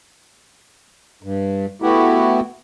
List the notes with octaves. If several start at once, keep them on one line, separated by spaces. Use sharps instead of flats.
G2
A3 B3 E4 F#4 G4